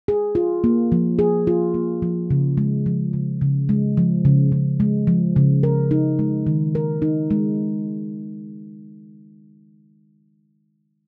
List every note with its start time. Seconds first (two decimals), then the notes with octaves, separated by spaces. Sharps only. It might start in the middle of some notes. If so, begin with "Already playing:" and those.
0.08 G#4
0.35 F4
0.64 A#3
0.92 F3
1.19 G#4
1.47 F4
1.74 A#3
2.02 F3
2.30 C#3
2.57 G#3
2.86 F3
3.13 C#3
3.41 C#3
3.69 G#3
3.97 F3
4.25 C#3
4.52 C#3
4.80 G#3
5.07 F3
5.36 C#3
5.63 A#4
5.91 D#4
6.19 G#3
6.47 D#3
6.75 A#4
7.02 D#4
7.31 G#3